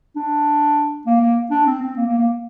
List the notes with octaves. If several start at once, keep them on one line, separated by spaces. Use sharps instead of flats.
D4
A#3
A#3
D4
C4
C4
A#3
A#3
A#3